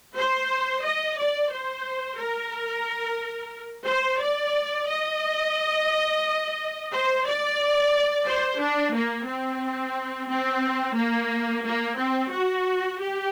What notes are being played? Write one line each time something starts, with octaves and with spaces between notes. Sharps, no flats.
C5
D#5
D5
C5
A#4
C5
D5
D#5
C5
D5
C5
D4
A#3
C4
C4
A#3
A#3
C4
F#4
G4